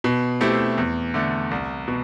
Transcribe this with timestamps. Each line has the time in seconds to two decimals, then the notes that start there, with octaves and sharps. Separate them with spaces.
0.04 B2
0.41 A3 C4 E4 G4
0.78 E2
1.14 D3 A3
1.51 C2
1.88 B2